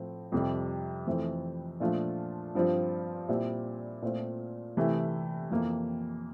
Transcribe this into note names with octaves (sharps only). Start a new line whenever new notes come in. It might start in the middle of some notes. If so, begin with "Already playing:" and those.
Already playing: A2 F3 C4
F2 C3 G3
F2 E3 A3 C4 E4
A#2 F3 A3 D4 F4
G2 F3 C4 F4
A#2 G3 C4 E4
A#2 A3 C4 F4
C3 E3 A3 E4
F2 E3 A#3